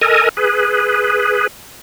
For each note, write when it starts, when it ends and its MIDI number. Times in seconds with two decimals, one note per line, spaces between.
0.01 0.29 69
0.01 0.29 70
0.01 0.29 75
0.01 0.29 80
0.37 1.47 68
0.37 1.47 71